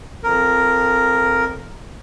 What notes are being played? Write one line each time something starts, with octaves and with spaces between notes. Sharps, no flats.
F2 A#4